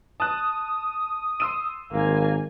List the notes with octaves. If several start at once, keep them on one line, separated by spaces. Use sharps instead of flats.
A5 D#6 F#6
C6 E6 D#7
G#1 A#3 G#5